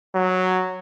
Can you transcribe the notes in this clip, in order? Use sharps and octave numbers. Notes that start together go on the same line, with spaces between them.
F#3